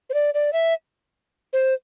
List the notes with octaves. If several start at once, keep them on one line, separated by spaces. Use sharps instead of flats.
C5
D5
D5
E5
C5